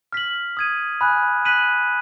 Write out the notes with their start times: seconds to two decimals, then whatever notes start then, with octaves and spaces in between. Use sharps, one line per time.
0.13 F6 B6 F#7
0.57 D#6 G#6 D#7
1.01 G#5 B5 D#6 F#6
1.45 F#6 B6 D#7 F#7